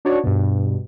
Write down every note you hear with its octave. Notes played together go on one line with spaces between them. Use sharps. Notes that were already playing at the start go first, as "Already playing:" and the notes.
D4 D#4 F#4 C#5 D5
G2 B2